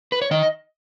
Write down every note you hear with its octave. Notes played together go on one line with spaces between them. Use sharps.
B4
C#5
D#3 D#5